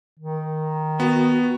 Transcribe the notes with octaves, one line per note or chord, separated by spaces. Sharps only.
D#3
B3 F#4